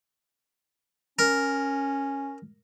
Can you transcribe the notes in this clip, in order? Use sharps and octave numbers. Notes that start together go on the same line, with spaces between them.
C#4 A#4